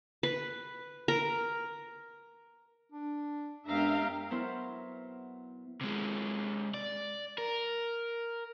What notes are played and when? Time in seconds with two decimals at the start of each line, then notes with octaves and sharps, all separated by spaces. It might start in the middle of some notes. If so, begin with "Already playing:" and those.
0.23 B4
1.08 A#4
2.92 D4
3.67 F#2 G#3 B3 D4 G4 E5 F5 A#5
4.30 F#3 B3 E4 A#4 C5
5.81 C3 G#3
6.74 D5
7.38 A#4